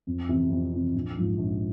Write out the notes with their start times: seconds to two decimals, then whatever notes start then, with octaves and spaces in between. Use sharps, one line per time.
0.07 F2
0.29 C3 E3
0.50 F2
0.73 C3 E3
0.95 A#1
1.16 G#2 F3
1.38 A#1